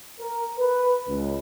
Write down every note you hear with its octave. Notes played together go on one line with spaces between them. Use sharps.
A#4
B4
C#2